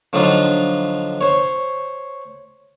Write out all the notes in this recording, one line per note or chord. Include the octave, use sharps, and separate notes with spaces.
D3 F3 F#3 D4 D#4 F4
C5 C#5